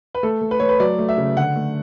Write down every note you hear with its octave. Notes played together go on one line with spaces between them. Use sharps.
B4
A3 A4
A3
B4
A3 C#5
B4
F#3 D5
A3
E5
C#3
D3 F#5
A3